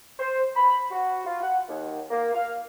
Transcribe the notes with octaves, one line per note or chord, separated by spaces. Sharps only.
C5
B5
F#4
F4
F#5
D#2
A#3
F5